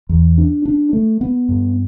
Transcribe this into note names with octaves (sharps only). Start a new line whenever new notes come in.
E2
D4
D4
A3
B3
G2